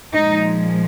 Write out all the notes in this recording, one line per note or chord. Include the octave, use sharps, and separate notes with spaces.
A#2 F3 G#3 D#4